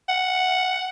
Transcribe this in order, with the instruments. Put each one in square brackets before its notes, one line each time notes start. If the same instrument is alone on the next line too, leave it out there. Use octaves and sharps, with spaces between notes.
[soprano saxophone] F#5